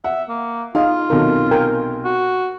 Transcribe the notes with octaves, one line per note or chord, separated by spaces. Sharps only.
E5 F#5
A#3
D#4 F4 G#4 D#5 F5
B1 C3 D#3 A4 A#4
A#4 G5 G#5
F#4